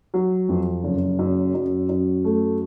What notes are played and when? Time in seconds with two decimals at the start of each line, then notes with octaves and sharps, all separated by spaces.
0.14 F#3
0.49 F2
0.84 F#1
1.19 F#2
1.54 F#2
1.89 F#2
2.24 A3